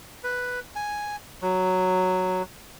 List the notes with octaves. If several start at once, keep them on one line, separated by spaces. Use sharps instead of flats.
B4
G#5
F#3